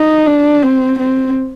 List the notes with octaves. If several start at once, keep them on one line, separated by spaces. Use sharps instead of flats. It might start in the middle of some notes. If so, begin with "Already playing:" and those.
Already playing: D#4
D4
C4
C4